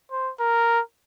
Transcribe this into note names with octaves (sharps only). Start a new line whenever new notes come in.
C5
A#4